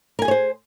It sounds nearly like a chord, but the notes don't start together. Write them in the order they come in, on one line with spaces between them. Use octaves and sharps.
A#4 G#5 G#4 C#5 C5